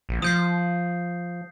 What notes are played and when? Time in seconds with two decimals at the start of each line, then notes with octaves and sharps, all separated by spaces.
0.09 A#1
0.22 F3 D#6 G6 C7